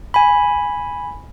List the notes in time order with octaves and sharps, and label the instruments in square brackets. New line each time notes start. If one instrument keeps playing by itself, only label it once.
[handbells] G#5 B5